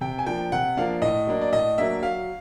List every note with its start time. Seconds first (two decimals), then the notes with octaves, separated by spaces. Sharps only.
0.01 C3 G5
0.19 G#5
0.26 F3 A#3 D4 G5
0.52 C3 F#5
0.77 F3 A#3 D4 F5
1.02 A2 D#5
1.27 F#3 A#3 D4
1.41 D5
1.52 A2 D#5
1.78 F#3 A#3 D4 E5
2.02 F#3 F5